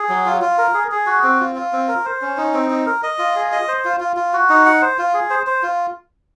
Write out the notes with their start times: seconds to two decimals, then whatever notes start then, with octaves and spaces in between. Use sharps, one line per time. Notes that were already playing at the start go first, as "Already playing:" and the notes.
Already playing: G#4
0.09 F#3
0.26 F4
0.42 F4
0.58 A#4
0.74 G#4
0.91 G#4
1.06 F#4
1.23 C4
1.40 F4
1.56 F4
1.73 C4
1.88 A#4
2.05 C5
2.22 C#4
2.37 D#4
2.54 C4
2.70 D#4
2.86 A#4
3.03 D#5
3.19 F4
3.36 G#4
3.52 D#5
3.68 C5
3.85 F4
4.00 F4
4.16 F4
4.33 F#4
4.50 D#4
4.66 F#5
4.82 C5
4.99 F4
5.14 G#4
5.30 C5
5.46 C5
5.63 F4